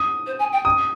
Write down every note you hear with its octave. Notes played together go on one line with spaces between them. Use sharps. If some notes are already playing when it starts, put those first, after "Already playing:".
Already playing: D#6
C5
G#5
G5
D#6